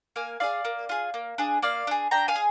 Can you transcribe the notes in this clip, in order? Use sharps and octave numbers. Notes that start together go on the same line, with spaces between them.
A#3 F5 G#5
F4 G#4 D5 F5
A#3
F4 G#4
A#3
D4 G#4
A#3 D5 F5
D4 G#4
D4 G5 A#5
F5 G#5
G#4